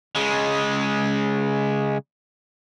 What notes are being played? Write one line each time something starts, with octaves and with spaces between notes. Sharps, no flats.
C#3 G#3